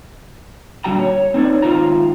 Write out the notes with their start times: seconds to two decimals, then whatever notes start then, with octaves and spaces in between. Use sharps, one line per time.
0.84 A#2 D3 G3 F#4 G5 A#5
1.00 C#5
1.34 C4 D#4 C#5 D5
1.62 G#2 D#3 F4 C5 A#5